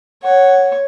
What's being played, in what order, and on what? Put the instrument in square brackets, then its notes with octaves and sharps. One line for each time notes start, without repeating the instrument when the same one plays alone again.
[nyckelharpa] C#5 [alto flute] F#5